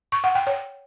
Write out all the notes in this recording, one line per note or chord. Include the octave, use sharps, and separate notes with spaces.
C#6
F#5
G5
C#5